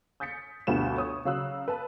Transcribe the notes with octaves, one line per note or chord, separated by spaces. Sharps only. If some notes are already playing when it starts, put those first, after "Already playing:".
D#6 G6 A6 B6 C#7
D2 G2 B2 F4 E7
C#5 D#6
C#3 F#3 F5 E6 F#6
B4 A5